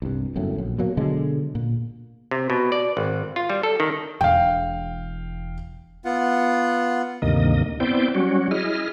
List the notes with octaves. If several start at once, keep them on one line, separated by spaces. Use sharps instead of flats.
C2 G2
G1 F#2 A2
A#1
B2 F#3 A#3
B2 D3 F#3 G#3
A#2
C3
B2
D5
G#1
F4
G3
A4
D#3
E1 F5 G5
B3 F4 F#5
D2 G2 C3 D#3 A#3 D#5
B3 C4 E4 C5 D5 G5
F#3 G3 C#4 F#4
E4 G#4 D#5 F6